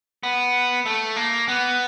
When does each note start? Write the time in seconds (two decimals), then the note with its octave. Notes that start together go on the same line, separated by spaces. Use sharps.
0.23 B3
0.86 A3
1.16 A#3
1.48 B3